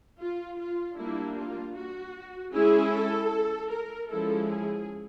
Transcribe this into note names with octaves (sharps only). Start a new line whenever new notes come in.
F4
F4
G3 A#3 D4 E4
F4
F#4
G#3 C#4 E4 G#4
A4
A#4
F3 G#3 C#4 E4 A4
G#4